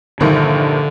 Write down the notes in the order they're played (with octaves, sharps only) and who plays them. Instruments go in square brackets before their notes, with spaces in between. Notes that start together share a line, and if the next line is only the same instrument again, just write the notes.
[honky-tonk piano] A#1 G2 D#3 [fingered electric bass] D3